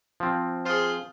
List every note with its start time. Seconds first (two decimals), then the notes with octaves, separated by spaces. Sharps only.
0.20 F3 C4
0.66 F4 G#4 C5